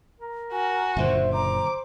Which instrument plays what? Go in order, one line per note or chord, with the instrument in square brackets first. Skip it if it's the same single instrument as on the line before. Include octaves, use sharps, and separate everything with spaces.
[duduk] A#4
[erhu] F#4 [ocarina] G#5
[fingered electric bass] F#1 A#2 D3 [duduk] C5 [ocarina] E5
[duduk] C5 [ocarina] A#5 [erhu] D6